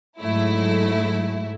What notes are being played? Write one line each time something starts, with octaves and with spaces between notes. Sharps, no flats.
G#2 F#3 A3 E4